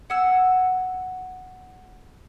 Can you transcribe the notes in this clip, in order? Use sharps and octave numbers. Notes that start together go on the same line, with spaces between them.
F#5 G#5 E6